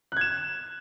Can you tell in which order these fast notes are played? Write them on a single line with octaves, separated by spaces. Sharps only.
F#6 G#6 E7